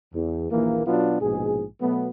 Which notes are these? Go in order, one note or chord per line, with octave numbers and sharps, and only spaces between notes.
E2
A#1 D#2 E3 A#3
B2 F#3 B3 D4 F4
A#1 G#2 B2 G#4
B2 F#3 A3 B3